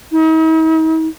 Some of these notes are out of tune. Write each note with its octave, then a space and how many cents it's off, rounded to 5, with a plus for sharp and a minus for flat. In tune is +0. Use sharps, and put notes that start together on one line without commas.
D#4 +45